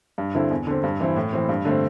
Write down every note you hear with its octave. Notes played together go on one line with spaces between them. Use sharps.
G2
D3 C4 E4
E2
D3 C4
G2
E3 C4 E4
A2
E3 C4
G2
D3 A3 C4